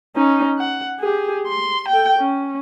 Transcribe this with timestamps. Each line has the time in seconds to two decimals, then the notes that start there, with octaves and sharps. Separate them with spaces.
0.16 C#4 D#4
0.59 F#5
1.00 G4 G#4
1.47 C6
1.89 A4 G5
2.19 C#4